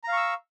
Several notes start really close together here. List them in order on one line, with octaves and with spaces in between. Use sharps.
A#5 F5 C#6 E6